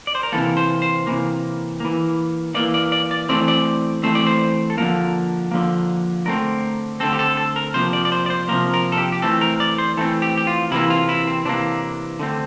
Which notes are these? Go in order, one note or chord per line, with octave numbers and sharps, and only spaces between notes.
D5
C5
A#4
C3 E3 A#3 A4
C5
C5
C3 E3 A#3
E3 A#3
E3 A#3 D5
D5
D5
D5
E3 A3 C4 D5
D5
E3 A3 C4 C5
D5
C5
A4
D3 F3 A#3 A#4
D3 F3 A#3
D3 A3 C4 A#4
D3 A3 C4 A4
G4
A4
A4
A#4
C3 F3 A#3 C5
D5
D5
C5
D5
C5
C3 F3 A#3 A#4
A#4
A4
G4
G4
E3 A3 C4 A4
A#4
D5
C5
E3 A3 C4 A4
G4
G4
F4
C3 E3 A#3 E4
F4
E4
C4
C3 E3 A#3 D4
D3 A3 C4